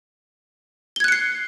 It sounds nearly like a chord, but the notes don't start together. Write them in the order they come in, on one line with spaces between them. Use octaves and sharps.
G7 G#6 F#6 C#7 C7